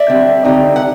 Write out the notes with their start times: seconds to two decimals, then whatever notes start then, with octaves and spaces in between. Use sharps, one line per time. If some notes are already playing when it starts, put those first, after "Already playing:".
Already playing: D5 E5
0.08 D3 G3 C4
0.44 D3 G3 C4 D#4
0.76 F#5